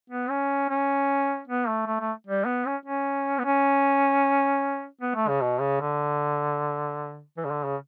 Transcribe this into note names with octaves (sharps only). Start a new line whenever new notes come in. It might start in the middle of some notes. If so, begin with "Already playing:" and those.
B3
C#4
C#4
B3
A3
A3
A3
G3
B3
C#4
C#4
B3
C#4
B3
A3
C#3
B2
C#3
D3
E3
C#3
D3
C#3